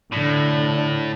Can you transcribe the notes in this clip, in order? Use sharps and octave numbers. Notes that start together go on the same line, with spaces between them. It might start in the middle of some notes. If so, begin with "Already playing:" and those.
A2 D3